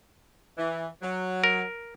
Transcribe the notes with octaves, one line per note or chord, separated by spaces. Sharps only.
E3
F#3
A#4